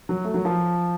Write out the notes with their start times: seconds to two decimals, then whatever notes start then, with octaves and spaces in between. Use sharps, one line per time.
0.09 F#3
0.25 A3
0.34 F#3
0.45 F3